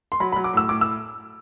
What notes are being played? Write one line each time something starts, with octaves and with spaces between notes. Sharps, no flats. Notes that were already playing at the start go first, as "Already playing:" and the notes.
C6
F#3 B5
B5
F#3
D6
A2 E6
A2 D6
E6